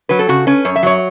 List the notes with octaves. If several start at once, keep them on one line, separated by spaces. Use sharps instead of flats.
F#3 B4
A4
C#3 F#4
C#4 B4
F#2 C#5
E5
F#3 C#5